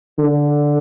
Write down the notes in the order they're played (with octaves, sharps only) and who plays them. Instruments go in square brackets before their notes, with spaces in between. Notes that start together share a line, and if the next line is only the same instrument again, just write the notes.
[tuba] D3